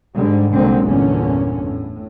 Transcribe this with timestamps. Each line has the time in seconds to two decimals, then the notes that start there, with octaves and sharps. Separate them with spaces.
0.16 G#2 D3 G3 G#3
0.53 C2 A#2 D3 F#3 G#3 C4
0.87 G1 E2 A#2 D3 C#4
1.64 A2